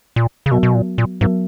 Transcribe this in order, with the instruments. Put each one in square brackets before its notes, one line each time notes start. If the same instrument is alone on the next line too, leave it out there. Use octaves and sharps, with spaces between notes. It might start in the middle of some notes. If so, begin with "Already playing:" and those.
[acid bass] A#2
C#3
[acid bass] B2 [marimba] F#3 B3 F#4 A#4
[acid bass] B2
A#2
A#2
[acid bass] G#2 [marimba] F#3 B3 F#4 A#4